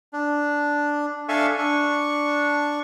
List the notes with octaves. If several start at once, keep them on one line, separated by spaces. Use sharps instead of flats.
D4
D4 A4 E5 F5 G#5 C#6
D4 C#6